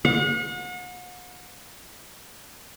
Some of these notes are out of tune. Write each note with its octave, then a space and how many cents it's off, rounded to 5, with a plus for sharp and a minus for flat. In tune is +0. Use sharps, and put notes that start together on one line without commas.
F#5 -40